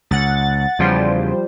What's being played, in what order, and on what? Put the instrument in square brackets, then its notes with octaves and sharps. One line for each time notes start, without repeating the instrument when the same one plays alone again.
[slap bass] C#2 [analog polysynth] F#5 A6
[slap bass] E2 C#3 [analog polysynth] F3 G3 C5